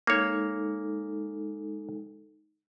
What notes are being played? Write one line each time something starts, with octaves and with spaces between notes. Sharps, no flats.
G#3 A#3 D#4 A4 C#5